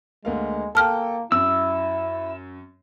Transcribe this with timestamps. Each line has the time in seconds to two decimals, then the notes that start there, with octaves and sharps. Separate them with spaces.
0.25 D2 G#3 A#3 F5
0.75 A#3 A4 G5 A5 F6
1.32 F#2 E4 E6